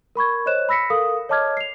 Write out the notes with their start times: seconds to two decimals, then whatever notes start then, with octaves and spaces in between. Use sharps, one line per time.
0.16 A#4 B5 C#6 G#6
0.46 C5 C#5 D#5 F#6 E7
0.69 B5 E6 A#6 B6 C#7
0.90 A4 A#4 F5 D#6
1.29 C#5 D#5 A5 D6 F6 G#6
1.57 C7 F7